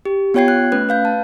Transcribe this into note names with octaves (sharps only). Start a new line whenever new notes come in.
G4
B3 F4 C#5 G5 G#6 C7
F#6
A3 C#4 B4 F#6
B4 F5 G6
A5